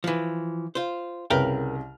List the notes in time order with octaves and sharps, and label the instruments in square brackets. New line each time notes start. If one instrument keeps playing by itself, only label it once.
[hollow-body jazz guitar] E3 F3
F4 C5
[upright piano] C2 C#3 F6 [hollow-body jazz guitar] A#4 B4 G5